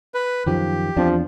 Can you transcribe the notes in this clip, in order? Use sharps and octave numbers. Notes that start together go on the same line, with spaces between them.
B4
F#2 D#3 F3 G4
E2 F3 C4 D4